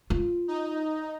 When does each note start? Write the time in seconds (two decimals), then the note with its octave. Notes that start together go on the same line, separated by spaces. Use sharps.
0.10 F4
0.48 D#4